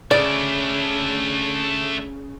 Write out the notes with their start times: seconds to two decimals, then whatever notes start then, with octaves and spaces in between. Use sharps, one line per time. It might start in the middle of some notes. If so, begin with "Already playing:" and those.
0.11 C#3 A3 D4 D5